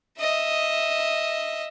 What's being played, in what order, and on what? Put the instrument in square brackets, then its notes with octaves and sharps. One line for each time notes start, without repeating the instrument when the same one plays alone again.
[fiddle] D#5 E5